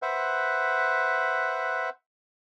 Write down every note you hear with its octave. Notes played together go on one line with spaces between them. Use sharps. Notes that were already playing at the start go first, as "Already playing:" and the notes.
B4 C5 E5 F#5